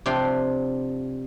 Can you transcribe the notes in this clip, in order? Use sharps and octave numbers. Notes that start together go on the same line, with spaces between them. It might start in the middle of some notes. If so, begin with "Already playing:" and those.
C3 F3 D4 F4 F5 G5